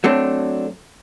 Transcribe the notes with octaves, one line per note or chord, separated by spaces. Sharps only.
F#3 A3 C4 D4